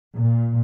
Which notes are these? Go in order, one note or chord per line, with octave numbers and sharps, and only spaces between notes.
A#2